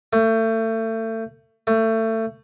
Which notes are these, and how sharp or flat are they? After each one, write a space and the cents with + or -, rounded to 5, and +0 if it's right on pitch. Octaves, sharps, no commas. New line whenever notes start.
A3 +30
A3 +25